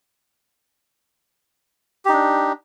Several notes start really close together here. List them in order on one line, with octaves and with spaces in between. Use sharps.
G4 D#4 D4